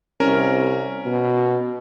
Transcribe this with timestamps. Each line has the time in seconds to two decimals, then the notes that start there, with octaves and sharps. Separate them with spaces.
0.20 C2 C#4 A#4
1.06 B2